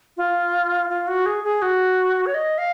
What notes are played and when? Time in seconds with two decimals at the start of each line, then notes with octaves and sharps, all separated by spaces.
0.17 F4
0.90 F4
1.08 F#4
1.26 G#4
1.44 G#4
1.62 F#4
2.26 C#5
2.34 D#5
2.58 F5